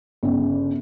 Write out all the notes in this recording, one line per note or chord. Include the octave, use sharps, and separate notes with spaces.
G1 C#3